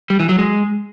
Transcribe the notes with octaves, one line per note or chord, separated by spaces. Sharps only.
G3
E3
F#3
G#3